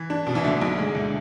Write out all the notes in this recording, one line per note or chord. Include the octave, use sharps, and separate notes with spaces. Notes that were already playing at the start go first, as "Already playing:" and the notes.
Already playing: E3
D4
B2
E3
D3 A3
B1
G#3
D2